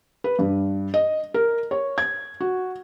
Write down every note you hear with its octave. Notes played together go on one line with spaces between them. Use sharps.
B4
G2
D#5
A#4
C#5
G#6
F#4